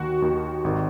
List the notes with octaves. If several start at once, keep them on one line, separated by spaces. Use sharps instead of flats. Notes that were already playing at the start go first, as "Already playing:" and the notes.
Already playing: D#2 D#3 F#4
D#2 D#3
G#1 D#3